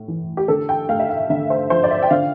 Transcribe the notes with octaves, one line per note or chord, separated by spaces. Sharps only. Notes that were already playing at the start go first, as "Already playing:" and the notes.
Already playing: A2
E3
G4
D3 A4
G5
A3 F5
E5
F5
D3 E5
C5
F3 C5
D5
E5
G5
D3 F5